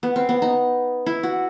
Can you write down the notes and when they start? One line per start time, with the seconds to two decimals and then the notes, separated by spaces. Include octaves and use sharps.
0.03 B3
0.16 C4
0.29 B3
0.42 D#4
1.06 E4
1.23 F#4